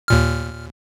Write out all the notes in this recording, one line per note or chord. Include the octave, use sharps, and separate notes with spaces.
D#2 A#2 F6